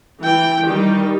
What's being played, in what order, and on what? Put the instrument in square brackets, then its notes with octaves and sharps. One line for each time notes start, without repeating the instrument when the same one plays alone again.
[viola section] E3 G5
D#3 G3 D#4 G4